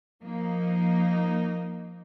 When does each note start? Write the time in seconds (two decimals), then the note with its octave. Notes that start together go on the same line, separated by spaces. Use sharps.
0.22 F3 A#3 D#4